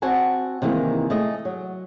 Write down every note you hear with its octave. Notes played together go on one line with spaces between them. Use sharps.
C4 F#4 F#5 G#5 A5
C3 D#3 E3 G#3 A#3
A3 G#4 D#5
F#3